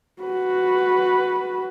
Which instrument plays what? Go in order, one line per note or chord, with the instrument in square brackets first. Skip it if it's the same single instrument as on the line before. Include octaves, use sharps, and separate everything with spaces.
[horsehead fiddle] F#4 B4